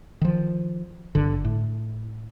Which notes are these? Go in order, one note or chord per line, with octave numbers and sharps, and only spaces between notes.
D#3 F3
G1 D3
A2